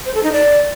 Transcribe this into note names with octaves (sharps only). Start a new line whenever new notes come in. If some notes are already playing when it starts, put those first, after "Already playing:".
C5
A4
D#4
D5